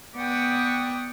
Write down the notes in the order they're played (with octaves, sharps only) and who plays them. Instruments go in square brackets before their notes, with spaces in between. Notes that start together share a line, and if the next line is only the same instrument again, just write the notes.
[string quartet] B3 D5 F#5 G5 C#6 D#6